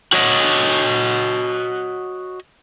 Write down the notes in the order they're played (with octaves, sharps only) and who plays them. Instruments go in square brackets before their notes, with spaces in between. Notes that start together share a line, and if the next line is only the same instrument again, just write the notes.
[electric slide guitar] F#4 C#5 D#5 F#5